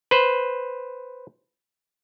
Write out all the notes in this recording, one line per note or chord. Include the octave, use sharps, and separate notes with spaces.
B4 C5